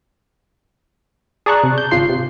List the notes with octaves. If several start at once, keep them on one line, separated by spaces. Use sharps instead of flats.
G#4 D5 A5 A#5 C#6 F#6
C3
G6
G#1 C#3 F4 C6 C7
C3